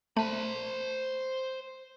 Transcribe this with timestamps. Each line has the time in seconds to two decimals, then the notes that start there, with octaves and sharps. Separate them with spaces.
0.17 A3 C5 B5